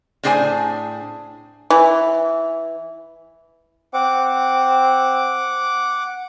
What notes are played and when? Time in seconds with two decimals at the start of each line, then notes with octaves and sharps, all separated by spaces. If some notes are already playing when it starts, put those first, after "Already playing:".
0.23 A2 D4 G#4 C5 G#5
1.70 E3
3.94 C4 F#5 D6